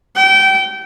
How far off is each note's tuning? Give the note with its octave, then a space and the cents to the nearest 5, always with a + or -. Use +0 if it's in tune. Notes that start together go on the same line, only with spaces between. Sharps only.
G5 -25